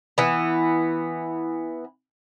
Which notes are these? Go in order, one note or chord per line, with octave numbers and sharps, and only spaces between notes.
E3 B3